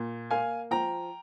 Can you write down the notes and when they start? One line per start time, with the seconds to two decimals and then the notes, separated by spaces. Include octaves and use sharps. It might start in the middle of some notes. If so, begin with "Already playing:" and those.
Already playing: A#2
0.31 A#3 F5 G#5
0.71 F3 G5 A#5